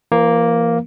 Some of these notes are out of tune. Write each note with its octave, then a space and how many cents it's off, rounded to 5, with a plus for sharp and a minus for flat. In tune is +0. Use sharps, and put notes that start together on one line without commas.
E3 +40 A#3 +0